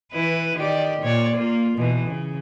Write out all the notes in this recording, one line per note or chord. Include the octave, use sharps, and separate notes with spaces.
E3 E4 B4
D#3 G4 D5
A#2 C#5 D5
A#3 F4
B2 E3
C#3